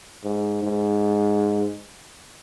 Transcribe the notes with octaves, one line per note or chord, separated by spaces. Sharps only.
G#2
G#2